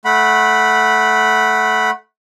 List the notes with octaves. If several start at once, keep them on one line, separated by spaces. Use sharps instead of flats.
A3 F#5 B5